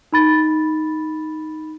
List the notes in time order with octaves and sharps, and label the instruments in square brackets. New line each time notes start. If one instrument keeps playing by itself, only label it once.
[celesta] D#4 B5 A6